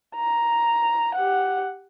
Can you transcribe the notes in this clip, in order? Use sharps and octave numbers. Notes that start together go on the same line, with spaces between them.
A#5
G4 F#5